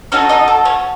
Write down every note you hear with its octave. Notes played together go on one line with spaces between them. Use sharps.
C#4 D#4 F#4 A4 C#5
D#4 D#5
A4
C#4 C#5